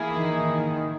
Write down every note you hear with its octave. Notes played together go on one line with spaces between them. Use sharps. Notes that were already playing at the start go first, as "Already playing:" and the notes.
Already playing: E3 A#3 E4 G#4
D#3